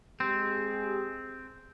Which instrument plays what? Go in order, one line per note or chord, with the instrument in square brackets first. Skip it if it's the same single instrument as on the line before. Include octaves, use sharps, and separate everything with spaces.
[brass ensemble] G#3 G4 G#4 [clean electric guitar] C4